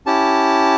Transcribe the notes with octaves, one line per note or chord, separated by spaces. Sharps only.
C#4 E4 G4 A5